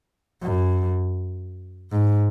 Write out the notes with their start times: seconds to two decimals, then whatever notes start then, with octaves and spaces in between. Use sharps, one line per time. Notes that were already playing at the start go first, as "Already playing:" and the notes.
0.42 F#2
1.91 G#2